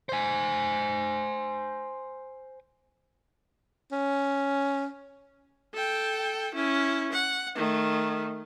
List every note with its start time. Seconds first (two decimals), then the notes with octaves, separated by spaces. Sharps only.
0.09 C5 G#5
3.92 C#4
5.74 A4 G5
6.55 C#4 E4
7.13 F#5
7.55 D#3 A3